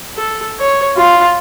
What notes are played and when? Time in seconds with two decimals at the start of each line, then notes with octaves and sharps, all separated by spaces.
0.17 A4
0.60 C#5
0.97 F4